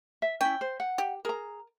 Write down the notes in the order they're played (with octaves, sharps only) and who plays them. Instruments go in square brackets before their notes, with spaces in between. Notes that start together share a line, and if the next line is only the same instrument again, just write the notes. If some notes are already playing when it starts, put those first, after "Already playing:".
[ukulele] E5
[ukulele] C#4 E4 [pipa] G5
[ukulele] C5
F#5
[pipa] G4
[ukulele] G#4 A#5 [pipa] A#4